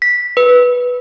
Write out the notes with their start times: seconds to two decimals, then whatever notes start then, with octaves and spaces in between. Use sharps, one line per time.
0.02 B6
0.37 B4